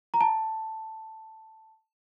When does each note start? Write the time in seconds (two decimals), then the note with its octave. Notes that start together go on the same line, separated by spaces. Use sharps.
0.14 A#5
0.21 A5